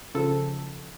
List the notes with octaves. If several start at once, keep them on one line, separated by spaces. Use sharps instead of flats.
C#3 F3 A4